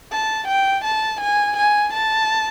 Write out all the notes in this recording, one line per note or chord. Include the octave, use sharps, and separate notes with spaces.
A5
G5
A5
G#5
G#5
A5